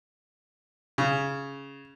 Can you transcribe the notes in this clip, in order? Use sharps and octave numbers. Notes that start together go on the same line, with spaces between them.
C#3